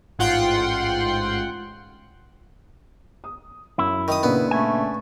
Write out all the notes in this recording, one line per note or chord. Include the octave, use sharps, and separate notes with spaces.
A1 G#2 F4 F#5 G5 C6
D#6
F#2 E4
D#3 D#6
A#2 C#3 B3 D4
A3 C#4 G#5